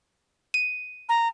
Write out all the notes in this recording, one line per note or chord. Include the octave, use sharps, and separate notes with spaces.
D#7
A#5